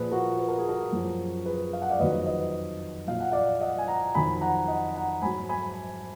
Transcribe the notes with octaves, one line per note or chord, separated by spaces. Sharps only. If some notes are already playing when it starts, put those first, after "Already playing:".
Already playing: A#2 F3 G#4 B4
F#4 A#4
B4
A#4
G#4
F#4 A#4
F#2 F3
G#4 B4
F5
F#5
D5 F5
F2 D#3 F#3 B4 D#5
B4 D#5
A#2 F#3 F5
F#5
D5 F5
D#5 F#5
G#5
F#5 A#5
F2 D#3 F#3 G#5 B5
F#5 A#5
D#5 F#5
F#5 A#5
G#2 F#3 G#5 B5
G#5 B5